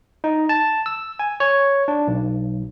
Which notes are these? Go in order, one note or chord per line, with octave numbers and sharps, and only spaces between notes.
D#4
A5
E6
G#5
C#5
D4
B1